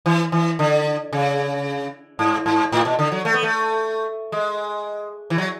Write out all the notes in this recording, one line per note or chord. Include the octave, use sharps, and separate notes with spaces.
E3
E3
D3
C#3
G#2
G#2
A2
B2
D3
F#3
A3
B3
A3
G#3
E3
F#3